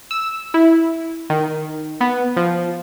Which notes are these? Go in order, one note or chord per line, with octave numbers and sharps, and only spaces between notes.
E6
E4
D#3
B3
F3